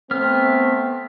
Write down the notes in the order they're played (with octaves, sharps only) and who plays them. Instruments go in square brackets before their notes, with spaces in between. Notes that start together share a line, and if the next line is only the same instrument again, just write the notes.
[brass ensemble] A3 C4 [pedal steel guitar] B3 F6